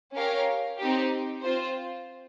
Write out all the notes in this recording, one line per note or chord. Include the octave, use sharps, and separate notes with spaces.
C#4 G4 A#4 C#5 F5
C4 D#4 G4
C4 F4 C5